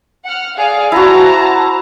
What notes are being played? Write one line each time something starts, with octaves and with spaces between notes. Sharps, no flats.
F#5 F6
G#4 D5 F5
E4 F#4 C5 A5 A#5